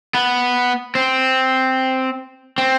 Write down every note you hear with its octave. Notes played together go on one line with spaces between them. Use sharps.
B3
C4
C4